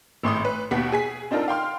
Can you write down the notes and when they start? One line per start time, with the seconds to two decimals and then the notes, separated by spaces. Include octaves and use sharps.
0.23 G#1 A2 C6 D#6
0.45 B4
0.71 D#2 B2 F#5 B6
0.92 G#4 G#5 B6
1.31 C4 D4 D#4 F4 A4 A#4
1.48 F5 G5 C6 F6